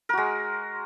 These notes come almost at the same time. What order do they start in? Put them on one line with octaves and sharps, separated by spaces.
A#4 F#4 G#3